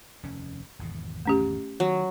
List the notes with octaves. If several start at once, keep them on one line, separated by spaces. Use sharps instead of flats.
F1 D#2 C#4
G#1 E2 B2
A3 C#4 G4
D#3 F#3